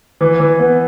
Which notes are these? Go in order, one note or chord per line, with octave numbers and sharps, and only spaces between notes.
E3
E3
B3